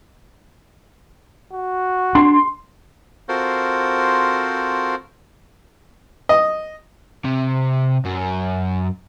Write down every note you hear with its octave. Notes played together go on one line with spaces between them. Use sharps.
F#4
D4 C6
C4 F4 F#4 A4 A#4 C5
D#5
C3
F#2